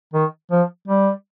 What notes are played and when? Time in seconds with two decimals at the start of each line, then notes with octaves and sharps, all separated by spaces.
0.14 D#3
0.51 F3
0.88 G3